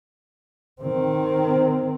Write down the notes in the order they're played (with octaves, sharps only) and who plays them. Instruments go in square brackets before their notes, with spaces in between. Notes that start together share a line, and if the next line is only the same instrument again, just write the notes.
[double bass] D#3 C4